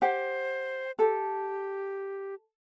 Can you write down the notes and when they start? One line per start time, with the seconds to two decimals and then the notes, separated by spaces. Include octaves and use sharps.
0.02 G4 C5 F#5
0.99 G4 A4